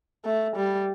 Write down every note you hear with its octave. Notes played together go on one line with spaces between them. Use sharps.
A3
G3